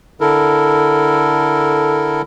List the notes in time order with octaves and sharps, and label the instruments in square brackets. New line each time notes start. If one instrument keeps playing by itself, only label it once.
[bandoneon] D3 E4 A4 A#4